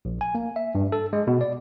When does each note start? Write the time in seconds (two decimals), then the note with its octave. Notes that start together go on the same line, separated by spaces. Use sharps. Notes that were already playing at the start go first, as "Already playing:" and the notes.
0.05 A#1
0.21 G#5
0.35 A#3
0.56 E5
0.75 G2
0.92 A4
1.13 G#3
1.27 B2
1.41 D5